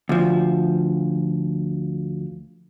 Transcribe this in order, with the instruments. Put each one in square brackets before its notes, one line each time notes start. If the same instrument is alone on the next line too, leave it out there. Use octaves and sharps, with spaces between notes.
[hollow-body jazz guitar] D2 F3